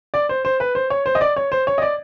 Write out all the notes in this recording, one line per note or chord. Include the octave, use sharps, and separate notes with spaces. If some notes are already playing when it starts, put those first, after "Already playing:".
D5
C5
C5
B4
C5
C#5
C5
D#5
D5
C#5
C5
C#5
D#5
D5